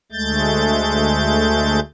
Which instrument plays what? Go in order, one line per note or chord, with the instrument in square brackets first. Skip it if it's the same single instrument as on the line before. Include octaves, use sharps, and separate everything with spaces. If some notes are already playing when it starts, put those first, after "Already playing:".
[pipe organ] D2 G#3 A3 G6 A6